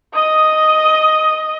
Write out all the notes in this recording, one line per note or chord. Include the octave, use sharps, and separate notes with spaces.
D#5 D#6